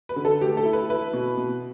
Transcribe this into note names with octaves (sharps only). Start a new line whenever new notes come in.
B4
D3
A4
A3 G4
A4
E4
B4
E4 B4
B2
B2